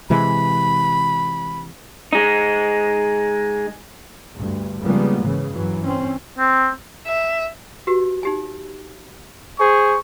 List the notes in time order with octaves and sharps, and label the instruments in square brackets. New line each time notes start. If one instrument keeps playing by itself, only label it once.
[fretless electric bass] C3 E3 G#3 [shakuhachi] B5
[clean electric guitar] G#3 D#4
[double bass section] D2 G2
C#3 F3 G3 G#3 A#3 B3
G#2 C#3 E3
G2 E3 F#3
C4 C#4
[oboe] C4
[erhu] E5
[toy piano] F#4 G4 B4
D#4 G4 G#5
[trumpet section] G#4 C5 C#6